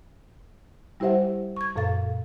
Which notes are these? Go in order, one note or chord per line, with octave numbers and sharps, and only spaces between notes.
G3 E4 G4 C5 E5 F#5
C#6 G#6
F#2 A#2 A4 F5 A6